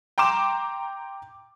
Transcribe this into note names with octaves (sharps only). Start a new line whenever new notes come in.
G5 A#5 C6 D6 E7